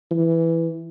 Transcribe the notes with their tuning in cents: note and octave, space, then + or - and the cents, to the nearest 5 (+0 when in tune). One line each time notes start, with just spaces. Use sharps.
E3 +5